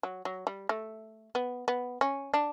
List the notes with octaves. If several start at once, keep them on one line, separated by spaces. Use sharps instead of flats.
F#3
F#3
G3
A3
B3
B3
C#4
D4